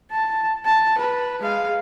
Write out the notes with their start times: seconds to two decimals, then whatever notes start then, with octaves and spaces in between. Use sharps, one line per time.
0.11 A5
0.65 A5
0.98 B4
1.40 G#3 F5